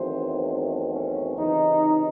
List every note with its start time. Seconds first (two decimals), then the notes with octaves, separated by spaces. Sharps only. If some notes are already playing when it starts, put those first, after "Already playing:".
Already playing: E2 D#3 F#3 A3 C4 C5
0.90 C#4
1.36 C#2 C3 E3 D#4